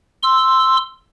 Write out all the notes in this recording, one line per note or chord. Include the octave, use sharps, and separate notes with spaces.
C6 E6